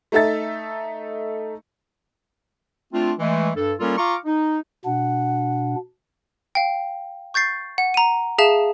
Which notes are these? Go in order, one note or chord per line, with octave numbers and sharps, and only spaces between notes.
A3 D#4 A4 E5 A6
A3 C4 D4 F4
E3 G#3 A3
G2 A4
G3 A#3 C#4 F4 A4 A#4
F4 F5 A#5 C#6 D6
D#4
B2 D4 F#5
F5 G5
C#6 G6 A6 C7
F#5
A#5 D#7
G#4 E5 F5 A5 E7